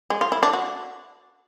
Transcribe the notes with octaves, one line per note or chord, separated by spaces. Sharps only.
G#3
F4
E4
D4
F#4